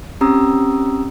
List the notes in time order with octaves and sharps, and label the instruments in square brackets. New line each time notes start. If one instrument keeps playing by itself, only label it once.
[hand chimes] C4 C#4 G4 A#5 D#6 E6